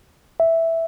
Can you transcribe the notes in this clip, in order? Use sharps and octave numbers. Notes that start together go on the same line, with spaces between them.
E5